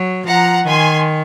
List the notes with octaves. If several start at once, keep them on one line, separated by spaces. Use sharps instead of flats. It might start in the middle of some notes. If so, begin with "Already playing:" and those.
Already playing: F#3
F3 F#5 A#5
D#3 G#5 C6